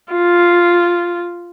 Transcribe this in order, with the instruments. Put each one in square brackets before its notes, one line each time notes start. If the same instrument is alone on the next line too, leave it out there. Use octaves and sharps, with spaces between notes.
[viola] F4